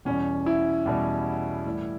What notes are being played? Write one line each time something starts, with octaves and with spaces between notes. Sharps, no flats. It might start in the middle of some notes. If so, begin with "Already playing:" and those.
E2 B2 G3 C#4
E4
E2 B2 G3
A2 E3 G3